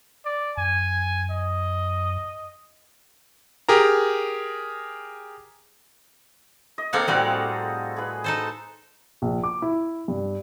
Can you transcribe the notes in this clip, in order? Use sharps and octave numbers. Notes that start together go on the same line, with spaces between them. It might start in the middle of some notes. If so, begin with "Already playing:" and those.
D5
F#2 G#5
D#5
G4 G#4 A#4 A#5
D#5
A#3 C4 G#4 A4 F5 F#5
A2 G3 C4 F#4 D5 D#5
G#4 B4
D#4 A4 C5
A#1
D6
E4
G2